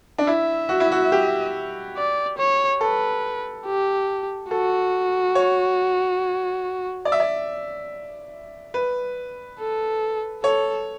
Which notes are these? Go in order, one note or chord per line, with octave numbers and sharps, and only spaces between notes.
D4
E4 E5
F#4
E4
F#4
G4
D5
C#5
A4 B4
G4
F#4 A4
C#5
D5
E5
D5
B4
A4
A4 C#5